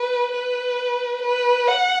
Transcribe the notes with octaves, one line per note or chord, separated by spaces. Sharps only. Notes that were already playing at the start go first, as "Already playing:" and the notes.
Already playing: B4
B4
B4
F#5